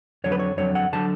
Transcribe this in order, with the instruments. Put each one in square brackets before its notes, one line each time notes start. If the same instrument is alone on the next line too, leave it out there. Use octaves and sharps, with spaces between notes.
[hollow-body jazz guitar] F2 D3 F#3 C#5
B4
C#5
F2 D3 F#3 C#5
F#5
D3 F#3 A5